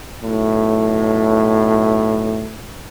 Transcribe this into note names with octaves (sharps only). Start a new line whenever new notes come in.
B1 A2